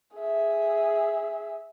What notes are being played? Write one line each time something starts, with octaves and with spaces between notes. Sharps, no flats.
G#4 E5